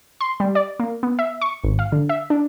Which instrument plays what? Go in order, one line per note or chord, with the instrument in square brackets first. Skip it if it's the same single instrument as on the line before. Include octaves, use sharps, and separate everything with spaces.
[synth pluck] C6
G3
D5
A#3
B3
E5
C#6
G#1
F5
D3
E5
D4